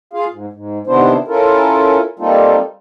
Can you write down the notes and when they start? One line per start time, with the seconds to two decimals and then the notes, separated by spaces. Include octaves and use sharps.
0.13 F4 G#4 F5
0.31 G#2
0.53 G#2
0.87 C3 D#3 B3 D4 E4 C5
1.28 C#4 E4 F4 A4 A#4
2.19 G3 A#3 C4 D#4 F4 A4